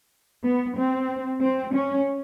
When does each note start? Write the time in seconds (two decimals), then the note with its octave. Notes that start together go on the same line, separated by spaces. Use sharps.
0.43 B3
0.76 C4
1.41 C4
1.74 C#4